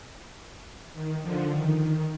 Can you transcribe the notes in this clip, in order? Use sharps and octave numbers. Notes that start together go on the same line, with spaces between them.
D#3
D3 F3
D#3
D#3